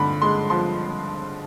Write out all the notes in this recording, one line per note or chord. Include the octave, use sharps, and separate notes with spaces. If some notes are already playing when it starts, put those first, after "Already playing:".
Already playing: G2 D3 B5
G#3 C6
F3 C6